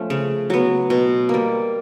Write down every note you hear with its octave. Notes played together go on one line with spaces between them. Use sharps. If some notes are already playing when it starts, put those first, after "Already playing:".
Already playing: F3 A3 C#4
C#3
F#3 B3
B2
G3 A#3